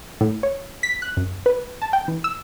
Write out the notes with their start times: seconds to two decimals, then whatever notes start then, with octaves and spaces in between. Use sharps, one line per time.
0.21 A2
0.43 C#5
0.83 B6
1.02 F#6
1.17 F#2
1.46 B4
1.82 A5
1.93 G5
2.08 E3
2.24 E6